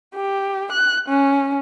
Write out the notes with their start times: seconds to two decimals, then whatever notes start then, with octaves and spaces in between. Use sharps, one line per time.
0.15 G4
0.72 F#6
1.08 C#4